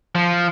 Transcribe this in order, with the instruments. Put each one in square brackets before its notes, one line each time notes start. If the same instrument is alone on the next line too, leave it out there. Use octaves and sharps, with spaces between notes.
[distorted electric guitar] F3